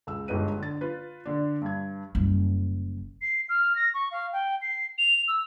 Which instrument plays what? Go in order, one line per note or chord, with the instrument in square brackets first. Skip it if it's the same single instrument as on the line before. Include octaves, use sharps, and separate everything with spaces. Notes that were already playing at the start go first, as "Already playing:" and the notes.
[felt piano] C#2 E6
G1 G#2 D#4 G4 B4 D#7
D3 A6
F4 B4
D3 D4
G2 G#6
[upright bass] F#1 G3
[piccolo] C7
F6
A#6
C#6
F5
G5
C7
F7
E6